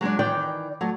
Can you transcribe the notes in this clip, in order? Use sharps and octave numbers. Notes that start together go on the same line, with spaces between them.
F#3 G#3 C4 D4
D#3 E3 D5 G5
F#3 A3